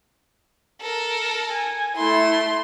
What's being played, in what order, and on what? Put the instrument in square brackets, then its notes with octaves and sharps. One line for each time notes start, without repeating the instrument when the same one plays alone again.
[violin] A4 A#4
[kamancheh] G#5
[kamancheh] A3 E4 [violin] C6